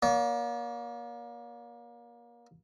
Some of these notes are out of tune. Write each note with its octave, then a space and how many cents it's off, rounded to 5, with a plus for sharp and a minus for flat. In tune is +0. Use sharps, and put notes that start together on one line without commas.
A#3 +30 D5 -45